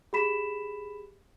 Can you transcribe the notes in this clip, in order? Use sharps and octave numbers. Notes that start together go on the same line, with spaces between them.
G4 G#4 B5 B6 E7